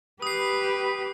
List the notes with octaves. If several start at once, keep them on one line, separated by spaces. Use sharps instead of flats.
G4 B4 D#6 C7